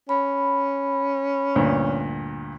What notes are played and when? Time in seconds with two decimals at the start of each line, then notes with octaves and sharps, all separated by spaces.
0.09 C#4 B5
1.56 D2 G2 A#2